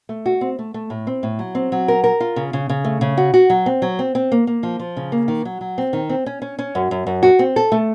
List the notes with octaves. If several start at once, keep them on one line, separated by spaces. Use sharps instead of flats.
A3
F#4
C4
A3
A3
A2
C4
A2
F#3
C4
F#3
A#4
A#4
F4
C#3
C#3
C#3
A3
C#3
F#4
F#4
F#3
C4
F#3
C4
C4
A#3
A#3
F3
F3
C#3
A#3
D#3
F#3
F#3
C4
D#3
C4
C#4
C#4
C#4
F#2
F#2
F#2
F#4
C4
A4
A3